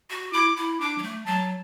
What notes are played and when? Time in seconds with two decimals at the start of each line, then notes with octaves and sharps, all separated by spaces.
0.10 F#4
0.33 E4 D6
0.56 E4
0.80 D4 D6
0.98 F#3
1.03 A3
1.26 F#3 A5